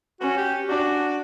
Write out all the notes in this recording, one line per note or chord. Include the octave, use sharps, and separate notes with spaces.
C#4 F#4
G4
D4 F#4